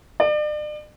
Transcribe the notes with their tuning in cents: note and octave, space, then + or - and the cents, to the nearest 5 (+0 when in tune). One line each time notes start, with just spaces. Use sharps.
D5 +40